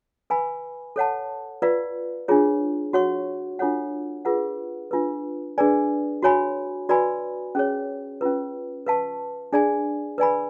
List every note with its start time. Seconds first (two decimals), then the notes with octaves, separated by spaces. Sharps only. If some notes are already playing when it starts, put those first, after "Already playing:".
0.30 B4 F5 G#5 B5
0.96 A4 C#5 F#5 A5
1.62 F4 B4 D5 F5
2.28 D4 F4 G#4 C#5
2.93 F#4 C#5 F#5 C#6
3.59 D4 F4 A4 C#5 F#5
4.25 F4 G#4 B4 F#5
4.91 D4 F4 B4
5.58 D4 G#4 B4 D5 G#5
6.23 F#4 C#5 G#5 B5
6.89 F#4 B4 D5 G#5 B5
7.55 C#4 G#4 C#5
8.21 C#4 F4 B4
8.86 B4 F5 A5 C#6
9.53 D4 G#4 D5 G#5
10.18 B4 D5 G#5 B5